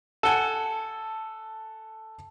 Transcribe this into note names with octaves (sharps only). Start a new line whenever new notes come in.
A4 F#5 G#5 A5 G7